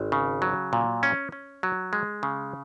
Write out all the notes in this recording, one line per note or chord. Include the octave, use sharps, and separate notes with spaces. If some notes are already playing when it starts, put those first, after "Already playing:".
Already playing: G#1
C#3
F#3
A#2
C#4
C#4
F#3
G#3
C#3